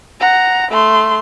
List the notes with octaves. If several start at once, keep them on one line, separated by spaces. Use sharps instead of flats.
F#5 A#5
A3 C6